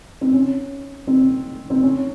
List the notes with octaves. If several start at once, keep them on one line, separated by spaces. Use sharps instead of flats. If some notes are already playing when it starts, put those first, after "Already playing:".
C4
C#4
C4
C4
C#4